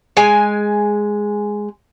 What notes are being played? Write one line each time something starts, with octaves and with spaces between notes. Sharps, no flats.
G#3 G#5